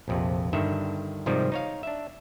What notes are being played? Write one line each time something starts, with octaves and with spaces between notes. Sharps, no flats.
A#1 F2 C3
G2 D3 D#3 E5
G#2 C3 D#3 F3 G3
D#4 C#5 F5
D4 E5